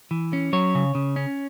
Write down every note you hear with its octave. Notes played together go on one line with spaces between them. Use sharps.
E3
C#4
F#3 C#5
C#3
C#3
C#4